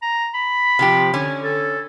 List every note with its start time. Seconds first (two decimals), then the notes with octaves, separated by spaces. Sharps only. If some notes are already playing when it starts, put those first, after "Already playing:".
0.02 A#5
0.34 B5
0.79 C3 F3 G4
1.14 D3 C#4
1.43 A4